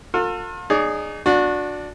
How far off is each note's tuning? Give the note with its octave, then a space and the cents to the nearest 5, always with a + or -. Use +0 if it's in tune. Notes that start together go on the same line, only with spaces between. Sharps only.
F4 +40 A4 +40
D#4 -35 G#4 +0 D5 -40
D4 +0 F#4 -30